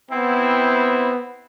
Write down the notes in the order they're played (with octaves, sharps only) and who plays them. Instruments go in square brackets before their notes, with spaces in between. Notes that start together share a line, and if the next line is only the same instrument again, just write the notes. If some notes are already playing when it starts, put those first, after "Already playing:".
[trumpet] B3 [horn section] C4 E4